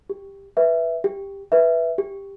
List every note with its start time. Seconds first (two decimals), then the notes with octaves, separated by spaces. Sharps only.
0.10 G4
0.57 B4 E5
1.04 G4
1.52 B4 E5
1.98 G4